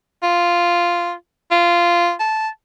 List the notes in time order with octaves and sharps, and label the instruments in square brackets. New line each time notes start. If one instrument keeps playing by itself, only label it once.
[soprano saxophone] F4
F4
A5